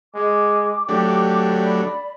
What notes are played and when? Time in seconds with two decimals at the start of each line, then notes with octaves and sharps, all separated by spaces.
0.14 G#3 D6
0.89 F#3 A3 D4 G4
1.61 D5 B5